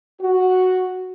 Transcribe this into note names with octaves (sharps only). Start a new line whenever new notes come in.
F#4